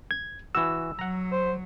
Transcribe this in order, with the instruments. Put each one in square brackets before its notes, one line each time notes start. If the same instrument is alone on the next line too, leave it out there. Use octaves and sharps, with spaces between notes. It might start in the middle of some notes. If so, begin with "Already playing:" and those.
[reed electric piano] G#6
[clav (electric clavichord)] E3 F#4 [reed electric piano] E6
[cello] F#3 [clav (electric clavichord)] F#5 A#5
[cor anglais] C5